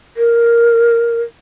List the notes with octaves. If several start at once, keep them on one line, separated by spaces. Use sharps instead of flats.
A#4